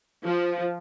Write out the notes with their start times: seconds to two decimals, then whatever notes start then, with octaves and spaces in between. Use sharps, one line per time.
0.25 F3